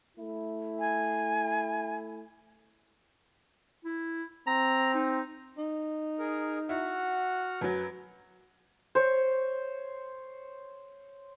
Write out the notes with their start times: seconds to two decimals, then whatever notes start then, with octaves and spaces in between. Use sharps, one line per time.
0.17 A3 E4
0.79 G#5
3.85 E4
4.48 C4 A#5
4.95 D#4
5.58 D#4
6.19 G#4 A#4
6.69 E4 F#4 F#5 F6
7.61 F#2 F#3 B4
8.95 C5 C#5